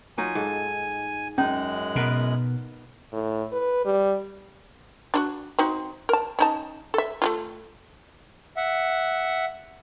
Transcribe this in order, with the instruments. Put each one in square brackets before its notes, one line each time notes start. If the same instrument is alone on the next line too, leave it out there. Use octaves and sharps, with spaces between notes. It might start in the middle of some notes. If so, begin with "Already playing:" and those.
[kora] F#3 D#4 F4 [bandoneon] G#5
[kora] G#2 A4
[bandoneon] F#2 G#3 F#6 [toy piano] C#4 [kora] D#4
[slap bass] B2 [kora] B3 A#4 B4
[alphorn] A2
B4
G3
[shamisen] D4 D#4 F#4
C4 D#4 F#4
A#4 A5
C#4 D#4 A5
A4 E5
A3 D4 F4
[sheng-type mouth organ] E5 F#5